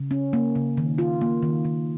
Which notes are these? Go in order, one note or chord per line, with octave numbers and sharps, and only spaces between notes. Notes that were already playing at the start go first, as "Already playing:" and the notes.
Already playing: C#3
C#4
A#3
C#3
D#3
F4
A#3
D#3
D#3